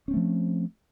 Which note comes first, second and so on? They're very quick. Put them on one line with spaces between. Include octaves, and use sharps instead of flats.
C#4 C4 A3 F3